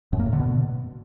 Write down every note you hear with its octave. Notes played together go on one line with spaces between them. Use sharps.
F#2
A#3
A2
D3
B2